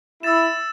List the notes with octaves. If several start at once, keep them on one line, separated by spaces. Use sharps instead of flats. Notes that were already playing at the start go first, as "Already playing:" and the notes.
E4 E6 A6 E7